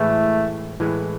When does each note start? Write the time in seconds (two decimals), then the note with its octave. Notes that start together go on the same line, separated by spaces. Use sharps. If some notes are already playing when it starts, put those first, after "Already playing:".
Already playing: A2 E3 G#3 A3
0.80 A2 E3 G#3